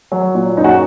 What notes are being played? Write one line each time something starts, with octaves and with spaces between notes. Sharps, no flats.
F#3
A#2
F#2 D#4
F#4